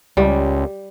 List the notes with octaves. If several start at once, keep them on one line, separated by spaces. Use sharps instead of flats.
C#2 G3